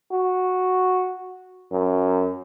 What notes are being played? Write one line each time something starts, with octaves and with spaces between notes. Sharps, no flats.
F#4
F#2